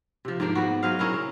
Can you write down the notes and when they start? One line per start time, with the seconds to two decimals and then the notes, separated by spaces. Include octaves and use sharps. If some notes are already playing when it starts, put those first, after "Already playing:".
0.25 C3 F3
0.40 G#2 F3 A#3 D4
0.55 B3 F#4
0.83 F#3 C5 D#5 F5
0.99 C#4 E4 A#4
1.12 C#3 C#4